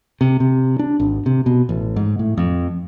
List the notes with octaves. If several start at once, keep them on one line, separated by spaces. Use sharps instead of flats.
C3
C3
D4
G#1
C3
B2
A1
G#2
A2
F2